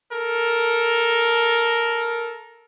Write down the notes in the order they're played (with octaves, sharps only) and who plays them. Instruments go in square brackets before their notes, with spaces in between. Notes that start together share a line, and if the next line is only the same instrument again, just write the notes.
[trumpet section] A4 A#4